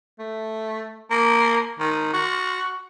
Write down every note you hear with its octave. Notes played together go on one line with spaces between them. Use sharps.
A3
A#3
D#3
F#4